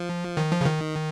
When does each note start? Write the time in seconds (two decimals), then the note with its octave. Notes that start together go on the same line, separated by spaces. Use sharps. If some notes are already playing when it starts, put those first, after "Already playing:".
Already playing: F3
0.37 D#3
0.51 F3
0.61 C#3
0.66 D#3